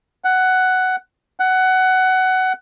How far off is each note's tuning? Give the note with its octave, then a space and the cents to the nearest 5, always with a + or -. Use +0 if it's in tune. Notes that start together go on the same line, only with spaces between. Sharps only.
F#5 +10
F#5 +15